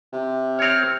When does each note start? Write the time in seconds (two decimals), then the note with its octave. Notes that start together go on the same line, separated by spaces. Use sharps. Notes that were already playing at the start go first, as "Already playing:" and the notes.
0.13 C3
0.59 C4 C#5 F6